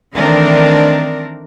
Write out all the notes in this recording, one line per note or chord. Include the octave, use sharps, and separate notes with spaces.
D#3 E3 A3 C4 D4 A#4